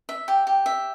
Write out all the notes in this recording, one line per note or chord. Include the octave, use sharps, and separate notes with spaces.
E5
G4
G4
E5